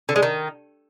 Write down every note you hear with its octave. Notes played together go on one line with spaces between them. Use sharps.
D3
G#3
D#3